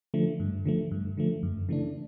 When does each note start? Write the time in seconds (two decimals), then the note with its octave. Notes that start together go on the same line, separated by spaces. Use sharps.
0.14 D3 F3 A3
0.40 G2
0.65 D3 F3 A3
0.91 G2
1.17 D3 F3 A3
1.43 F#2
1.69 C#3 E3 A3 D4